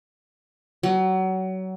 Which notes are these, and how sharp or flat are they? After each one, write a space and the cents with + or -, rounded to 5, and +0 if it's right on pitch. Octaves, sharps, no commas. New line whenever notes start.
F#3 +25